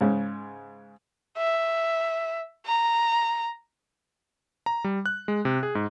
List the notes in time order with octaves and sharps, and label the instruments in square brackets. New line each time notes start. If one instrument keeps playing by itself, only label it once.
[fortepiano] G#2 C#3 G#3
[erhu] E5
A#5
[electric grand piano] A#5
G3
F#6
G#3
C3
G#4
G#2